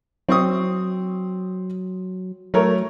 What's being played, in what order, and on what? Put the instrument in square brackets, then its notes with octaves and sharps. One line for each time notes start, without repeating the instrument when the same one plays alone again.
[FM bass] F#3 [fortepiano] C4 C#6 D#6
[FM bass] F#3 [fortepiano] A3 A#4 C#5